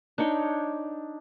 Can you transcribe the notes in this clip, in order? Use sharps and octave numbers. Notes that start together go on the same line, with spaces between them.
D4 D#4 C#5 G5